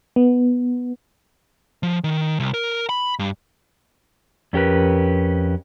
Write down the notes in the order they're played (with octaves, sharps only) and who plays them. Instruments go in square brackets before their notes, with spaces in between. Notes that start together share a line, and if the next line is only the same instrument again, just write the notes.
[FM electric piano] B3
[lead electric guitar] F3
D#3
C2
A#4
B5
G2
[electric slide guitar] F2 C#4 G4 A#4 B4